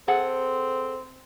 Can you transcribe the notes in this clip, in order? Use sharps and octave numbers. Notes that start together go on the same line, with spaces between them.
C4 G#4 A4 F#5